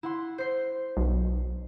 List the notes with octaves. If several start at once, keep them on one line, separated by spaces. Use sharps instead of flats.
E4 F#5 C6
C5 C7
B1